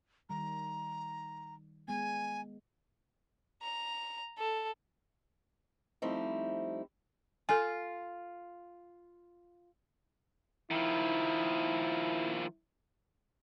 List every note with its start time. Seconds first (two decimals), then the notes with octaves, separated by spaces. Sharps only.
0.29 D#3 G3 A#5
1.88 G#3 B3 G#5
3.62 A#5
4.38 A4
6.02 F3 G3 A3 C4 D#4 E4
7.49 F4 A4 G#5
10.71 D#3 F3 E4